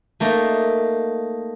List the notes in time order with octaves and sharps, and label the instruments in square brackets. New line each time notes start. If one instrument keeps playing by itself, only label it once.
[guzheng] A3 A#3 D#4 A5